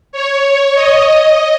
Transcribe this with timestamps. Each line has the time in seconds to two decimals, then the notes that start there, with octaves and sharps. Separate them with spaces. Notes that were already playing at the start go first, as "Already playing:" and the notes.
0.12 C#5
0.75 D#5